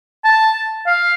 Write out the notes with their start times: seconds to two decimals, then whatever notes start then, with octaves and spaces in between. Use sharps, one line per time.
0.25 A5
0.87 F5